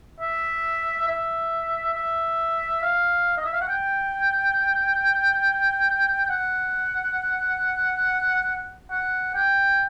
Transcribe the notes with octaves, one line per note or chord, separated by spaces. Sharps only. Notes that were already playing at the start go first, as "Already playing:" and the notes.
E5
E5
E5
F5
D#5
E5
F5
F#5
G5
F#5
F#5
G5